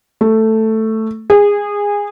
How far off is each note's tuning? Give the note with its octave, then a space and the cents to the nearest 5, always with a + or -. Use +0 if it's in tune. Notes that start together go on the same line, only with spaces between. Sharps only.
A3 +5
G#4 -20